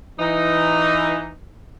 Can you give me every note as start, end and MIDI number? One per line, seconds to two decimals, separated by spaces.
0.19 1.29 52
0.19 1.29 63